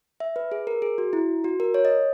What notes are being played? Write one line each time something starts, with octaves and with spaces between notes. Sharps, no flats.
E5
B4
G#4
A#4
G#4
F#4
E4
F#4
A#4
C#5
D#5